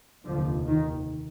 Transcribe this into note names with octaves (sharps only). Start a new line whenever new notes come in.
F1 D#2 D3 F3
D#3